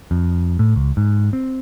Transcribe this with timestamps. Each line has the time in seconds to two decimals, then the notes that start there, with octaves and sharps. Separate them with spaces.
0.11 F2
0.59 A2
0.76 C#2
0.97 G#2
1.33 C4